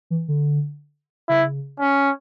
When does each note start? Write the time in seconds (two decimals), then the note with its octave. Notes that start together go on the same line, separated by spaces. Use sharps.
0.10 E3
0.28 D3
1.29 C#3 E4
1.80 C#4